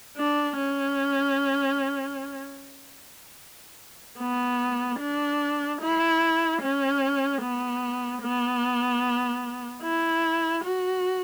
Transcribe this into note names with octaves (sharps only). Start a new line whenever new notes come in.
D4
C#4
B3
D4
E4
C#4
B3
B3
E4
F#4